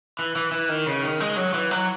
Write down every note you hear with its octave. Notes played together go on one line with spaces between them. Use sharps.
E3
E3
E3
D#3
C#3
D#3
G#3
F#3
E3
F#3